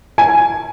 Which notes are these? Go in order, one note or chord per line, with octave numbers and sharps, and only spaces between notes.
G#5